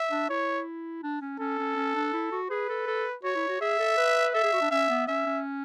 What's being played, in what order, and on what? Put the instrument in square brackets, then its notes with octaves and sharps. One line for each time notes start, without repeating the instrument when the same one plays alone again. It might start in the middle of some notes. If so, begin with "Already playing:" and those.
Already playing: [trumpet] E5
[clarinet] D4
[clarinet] E4 [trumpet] C#5
[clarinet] D4
C#4
[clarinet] C#4 [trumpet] A4
[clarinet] C#4
C#4
D4
E4
F#4
[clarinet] G#4 [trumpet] B4
[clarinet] A4
A4
[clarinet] F#4 [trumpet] C#5
[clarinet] E4
F#4
[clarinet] G#4 [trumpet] E5
[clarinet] A4
B4
[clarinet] A4 [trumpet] E5
[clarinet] G#4
F#4
D4
[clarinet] C#4 [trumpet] E5
[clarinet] B3
[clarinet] C#4 [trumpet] E5
[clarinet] C#4